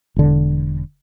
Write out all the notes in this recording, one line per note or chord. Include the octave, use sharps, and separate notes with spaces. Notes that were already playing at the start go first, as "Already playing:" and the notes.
E1 D3